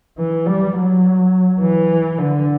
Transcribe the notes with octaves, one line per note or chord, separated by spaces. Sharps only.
E3
G3
F#3
E3
D3